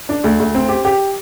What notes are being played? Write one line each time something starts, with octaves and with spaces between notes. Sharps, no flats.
D4
D2
D2
C4
G4
G4